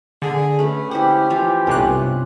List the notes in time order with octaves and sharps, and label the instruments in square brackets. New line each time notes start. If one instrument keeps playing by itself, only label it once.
[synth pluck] D3 [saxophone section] G#4
[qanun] A3 B4 [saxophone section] C#4
[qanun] E4 C5 F#5 [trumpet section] G4
[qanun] E3 F3 F4
[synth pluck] B1 C3 F#6 [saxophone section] G2 [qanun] C#4 F4